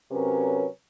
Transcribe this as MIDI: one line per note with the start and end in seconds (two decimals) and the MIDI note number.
0.11 0.66 48
0.11 0.66 54
0.11 0.66 61
0.11 0.66 70
0.11 0.66 71